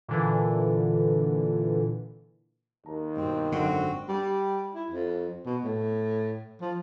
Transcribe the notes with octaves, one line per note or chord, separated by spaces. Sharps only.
A#2 D3 E3
D#2 A#5
G2 B2 C4
G#1 F#2 D3 C4 F#4
G3
E4
F2
B2
A2
F3